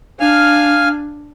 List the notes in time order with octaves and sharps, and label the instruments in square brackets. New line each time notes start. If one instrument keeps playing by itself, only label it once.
[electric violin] D4 [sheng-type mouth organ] F5 G#5 F6